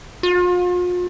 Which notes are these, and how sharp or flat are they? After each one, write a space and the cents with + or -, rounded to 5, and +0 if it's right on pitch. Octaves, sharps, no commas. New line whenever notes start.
F4 +40